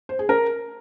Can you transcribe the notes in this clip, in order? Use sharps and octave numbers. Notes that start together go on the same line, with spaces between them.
C5
G#4
A#4